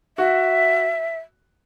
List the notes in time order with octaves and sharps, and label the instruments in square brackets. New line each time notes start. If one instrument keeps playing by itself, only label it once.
[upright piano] F#4 [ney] E5